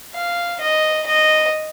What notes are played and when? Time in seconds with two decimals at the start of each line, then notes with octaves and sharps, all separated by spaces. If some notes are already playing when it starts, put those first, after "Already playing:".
0.14 F5
0.61 D#5
1.06 D#5